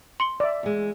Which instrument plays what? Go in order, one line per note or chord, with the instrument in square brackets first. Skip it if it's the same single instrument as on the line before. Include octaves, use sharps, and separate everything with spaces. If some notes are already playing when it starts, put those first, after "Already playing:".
[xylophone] C6 C#7 G7
[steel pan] D5 E5
[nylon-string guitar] E2 G#3